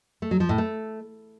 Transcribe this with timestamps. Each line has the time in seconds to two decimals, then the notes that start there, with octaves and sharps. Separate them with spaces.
0.22 A3
0.31 F#3
0.40 F3
0.49 A2
0.58 A3